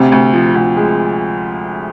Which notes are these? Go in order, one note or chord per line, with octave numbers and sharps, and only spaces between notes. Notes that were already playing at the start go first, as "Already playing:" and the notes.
Already playing: D2 C3
D2
F3
D2
G#3